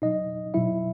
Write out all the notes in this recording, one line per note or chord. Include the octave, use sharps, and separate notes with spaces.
B2 F#3 D#4 D#5
B2 F#3 E4 E5